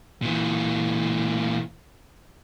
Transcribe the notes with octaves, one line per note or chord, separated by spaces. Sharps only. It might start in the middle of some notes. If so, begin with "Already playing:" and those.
A#2 E3